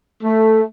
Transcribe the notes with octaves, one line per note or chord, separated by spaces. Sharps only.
A3